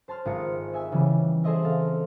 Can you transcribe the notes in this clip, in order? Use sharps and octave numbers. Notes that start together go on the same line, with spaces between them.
C5 A5 C6 F6
G#1 G#3 F4 A#4 D#6 C#7
D#5 E5 G#5 E6
C#3 E3 G3 B3
G#4 A4 C5 D#5 E5
C4 A4 F5